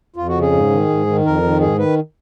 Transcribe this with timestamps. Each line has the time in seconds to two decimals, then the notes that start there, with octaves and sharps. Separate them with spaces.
0.16 F2 F4
0.28 F#4
0.35 C#3
0.41 G#4
0.52 G#2
0.70 D#3
0.89 G#2
1.06 D#3
1.25 F2 A#4
1.43 D#3
1.60 G#2 G#4
1.78 D#3 B4